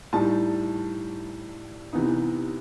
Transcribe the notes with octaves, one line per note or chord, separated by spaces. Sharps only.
A2 G3 D#4 A5
C3 E3 B3 D#4